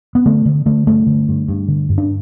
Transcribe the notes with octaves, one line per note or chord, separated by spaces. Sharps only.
B3
D3 A3
D3
D3 A3
G2 A3
D3
G2
G2
D3
G2
D4